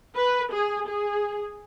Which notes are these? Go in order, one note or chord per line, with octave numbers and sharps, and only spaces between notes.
B4
G#4
G#4